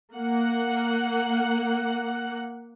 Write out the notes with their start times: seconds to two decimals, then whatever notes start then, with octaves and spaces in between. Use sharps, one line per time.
0.14 A#3 F#5